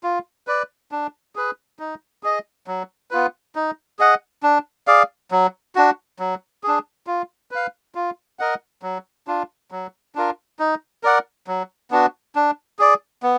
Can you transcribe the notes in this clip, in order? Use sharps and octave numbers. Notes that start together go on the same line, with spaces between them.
F4
B4 D5
D4
G#4 B4
D#4
G#4 D#5
F#3
B3 F4 B4
D#4
G#4 D#5 F#5
D4
G#4 D5 F5
F#3
D4 F#4
F#3
D4 G#4
F4
B4 F5
F4
A#4 D#5 F#5
F#3
D4 F4
F#3
D4 F4 A#4
D#4
A#4 D5 F#5
F#3
B3 D4 F#4
D4
G#4 D5
B3